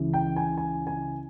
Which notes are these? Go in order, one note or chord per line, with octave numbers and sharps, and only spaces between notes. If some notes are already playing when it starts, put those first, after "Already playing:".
Already playing: C#2 C#3 E3
G5
G#5
G#5
G#5